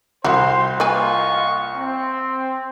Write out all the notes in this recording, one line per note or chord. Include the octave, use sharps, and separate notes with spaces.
C2 E4 F#4 C5 C6
A#3 F4 B4 D#5 G#5 C#6
C4